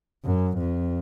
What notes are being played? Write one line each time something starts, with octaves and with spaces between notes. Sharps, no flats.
F#2
F2